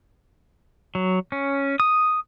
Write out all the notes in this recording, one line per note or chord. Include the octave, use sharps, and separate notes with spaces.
F#3
C#4
D#6